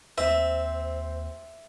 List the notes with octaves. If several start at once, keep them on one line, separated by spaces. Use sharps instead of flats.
D#2 C4 C5 E5